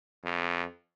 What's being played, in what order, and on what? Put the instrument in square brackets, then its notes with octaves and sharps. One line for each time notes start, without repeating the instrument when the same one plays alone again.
[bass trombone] F2